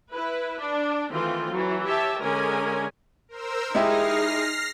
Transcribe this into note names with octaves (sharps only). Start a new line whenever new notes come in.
E4 B4
D4
D#3 E3 A3 C4 F4
E3 F#3
G4 C#5 E5 A5
D3 G#3 C#4 G#4 A#4 G#5
A#4 C5 E6
G#3 D#4 E4 G4 G#4 F6 A#6 C7